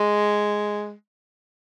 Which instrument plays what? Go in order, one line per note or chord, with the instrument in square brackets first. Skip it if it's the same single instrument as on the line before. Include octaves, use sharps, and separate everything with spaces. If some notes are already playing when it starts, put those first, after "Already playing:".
Already playing: [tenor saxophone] G#3